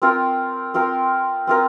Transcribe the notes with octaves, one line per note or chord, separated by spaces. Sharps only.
C4 F4 A#4
C4 F4 A#4
C4 F4 A#4